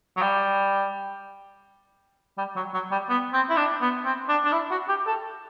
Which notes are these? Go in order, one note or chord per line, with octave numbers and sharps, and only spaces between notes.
F#3
G3
G3
F#3
F#3
G3
B3
C4
E4
D4
B3
C4
D4
D4
E4
F#4
G4
A4